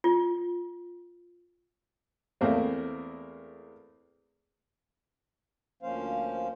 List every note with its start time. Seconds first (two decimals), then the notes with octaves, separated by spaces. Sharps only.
0.04 F4
2.41 E2 A3 A#3 C4
5.83 D2 F3 A#3 C#4 C5 F5